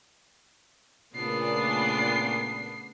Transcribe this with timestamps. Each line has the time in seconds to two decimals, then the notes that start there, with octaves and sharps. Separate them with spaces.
1.15 A#2 C#3 A3 B3 D4 C7